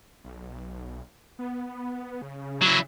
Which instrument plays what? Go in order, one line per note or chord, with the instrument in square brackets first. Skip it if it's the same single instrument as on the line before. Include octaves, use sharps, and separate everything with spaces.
[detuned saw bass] B1
B3
C#3
[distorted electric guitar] F#3 E4